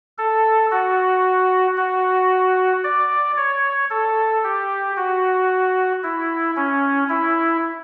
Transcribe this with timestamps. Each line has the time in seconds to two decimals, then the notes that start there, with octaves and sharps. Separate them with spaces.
0.18 A4
0.71 F#4
1.77 F#4
2.84 D5
3.37 C#5
3.90 A4
4.44 G4
4.97 F#4
6.03 E4
6.56 C#4
7.09 E4